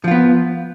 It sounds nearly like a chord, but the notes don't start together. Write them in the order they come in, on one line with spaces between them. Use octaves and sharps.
F3 F4 B3